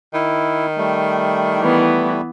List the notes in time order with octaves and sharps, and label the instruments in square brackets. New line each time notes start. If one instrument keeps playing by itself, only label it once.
[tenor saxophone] D#3 [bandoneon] E4
[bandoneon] G3 A3
[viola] E3 B3